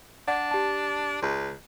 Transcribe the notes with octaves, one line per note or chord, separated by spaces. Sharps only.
D4 D5 F#5
G4 A5
C#2